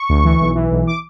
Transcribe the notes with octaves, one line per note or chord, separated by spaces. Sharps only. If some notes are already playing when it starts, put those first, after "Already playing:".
Already playing: C#6
D2
E3
B1
E3
B1
D6